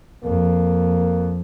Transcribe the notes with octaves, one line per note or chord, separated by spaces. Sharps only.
F2 A#3